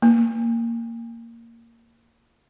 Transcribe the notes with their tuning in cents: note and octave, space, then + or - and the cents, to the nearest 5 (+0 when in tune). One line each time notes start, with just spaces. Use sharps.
A#3 -10